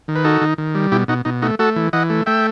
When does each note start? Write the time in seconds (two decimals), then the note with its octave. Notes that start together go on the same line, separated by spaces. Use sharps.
0.08 D#3
0.15 B4
0.24 D#4 F#4 A4
0.41 D#3
0.58 D#3
0.75 G3
0.92 B2 E4 G4
1.08 B2 D#4 F#4
1.25 B2 D#4
1.42 A3 D#4 F#4
1.59 A3 F#4 A4
1.76 E3
1.93 E3 D#5 F#5
2.10 A3
2.26 A3 E5 G5